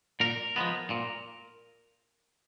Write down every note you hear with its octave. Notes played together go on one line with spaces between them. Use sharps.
A#2 A#4
F3 G#3 B3
A#2